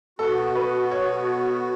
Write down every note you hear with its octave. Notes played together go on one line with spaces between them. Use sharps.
B2 B3 F#4 A4
B4
C#5